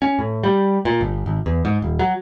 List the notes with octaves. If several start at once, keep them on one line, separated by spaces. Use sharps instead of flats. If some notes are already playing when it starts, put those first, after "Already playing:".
C#4
A2
G3
A#2
G1
G#1
E2
G#2
D#1
F#3